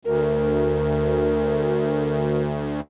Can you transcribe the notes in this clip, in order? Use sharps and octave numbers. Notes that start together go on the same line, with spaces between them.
D2 A#4